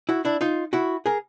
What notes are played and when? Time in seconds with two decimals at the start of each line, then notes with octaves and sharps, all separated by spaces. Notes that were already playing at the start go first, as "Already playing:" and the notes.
0.09 E4 F#4
0.25 D4 E4
0.41 D#4 F4
0.73 E4 F#4
1.06 G#4 A#4